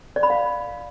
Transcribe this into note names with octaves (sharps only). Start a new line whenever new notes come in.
D5
B5
F5